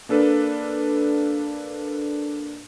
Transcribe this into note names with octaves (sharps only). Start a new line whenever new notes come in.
A#3 D4 A4 B4